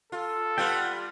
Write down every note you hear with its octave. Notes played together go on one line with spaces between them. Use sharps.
F4 A4
G3 B3 F4 F#5 G5